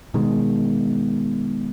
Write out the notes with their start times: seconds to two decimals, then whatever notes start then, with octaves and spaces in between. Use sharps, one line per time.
0.14 B2 D#3 G#3